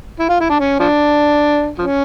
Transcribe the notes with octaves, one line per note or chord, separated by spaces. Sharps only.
E4
F4
E4
D4
C#4
F3 D4
F3 C#4